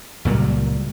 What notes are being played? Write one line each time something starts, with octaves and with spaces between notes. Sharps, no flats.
C#2 A#2 F#3 G3